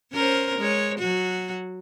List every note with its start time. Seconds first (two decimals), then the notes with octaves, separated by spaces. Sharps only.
0.12 C#4 A#4 C5
0.59 G#3 C#5
0.98 F#3 F#4